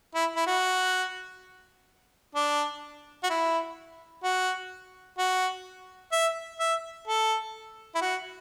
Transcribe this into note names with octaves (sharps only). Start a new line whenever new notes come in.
E4
E4
F#4
D4
F#4
E4
F#4
F#4
E5
E5
A4
E4
F#4